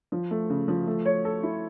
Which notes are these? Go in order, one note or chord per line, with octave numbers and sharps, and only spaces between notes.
F3
A3
C#3
F3
A3
C#5
A4
E4